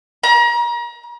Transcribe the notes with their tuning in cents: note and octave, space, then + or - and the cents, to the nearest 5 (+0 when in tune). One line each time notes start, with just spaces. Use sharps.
A#5 +35